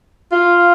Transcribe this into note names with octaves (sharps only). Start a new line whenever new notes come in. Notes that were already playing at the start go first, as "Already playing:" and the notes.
F4